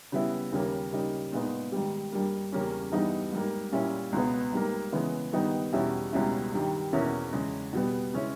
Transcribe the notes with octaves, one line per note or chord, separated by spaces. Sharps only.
C#3 G3 B3 E4
D#2 C#3 G3 A#3
C#3 G3 A#3 D#4
A#2 G#3 B3 D#4
G#2 D#3 G3
G2 G3 A#3
E2 C#3 G3 A#3 C#4
G2 E3 G3 B3 D#4
G#2 G3 A#3
A#2 G3 C#4 E4
C#2 B2 G#3 B3
G#2 G3 A#3
C#3 E3 G#3 B3
G2 D#3 G3 B3 D#4
E2 B2 G3 C#4 E4
C#2 B2 G3 C#4 E4
G2 D#3 G3
E2 B2 A#3 C#4 E4
E2 C#3 G#3
B2 G3 B3
C#3 G#3 C#4 E4